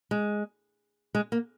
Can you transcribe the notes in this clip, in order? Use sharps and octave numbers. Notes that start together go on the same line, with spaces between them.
G#3
G#3
A#3